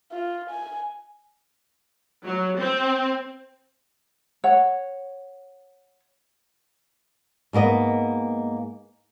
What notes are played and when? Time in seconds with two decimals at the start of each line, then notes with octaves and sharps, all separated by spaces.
0.12 F4
0.50 G#5
2.25 F#3
2.58 C4
4.44 C#5 F#5
7.53 G#2 A#3 B3 D#5